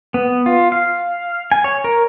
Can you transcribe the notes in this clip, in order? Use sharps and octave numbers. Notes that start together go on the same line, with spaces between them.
B3
F4
F5
G#5
C#5
A#4